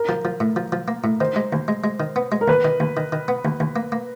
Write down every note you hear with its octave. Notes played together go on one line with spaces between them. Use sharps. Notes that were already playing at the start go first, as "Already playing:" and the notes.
Already playing: A#4
F3
F3
A2
F3
F3
A#3
A2
D#3 C5
G#3
D#2
G#3
G#3
D#3
B3
G#3
A#4
D#2 B4
D#3
D#2
D#3
D#3
B3
D#2
D#2
A#3
A#3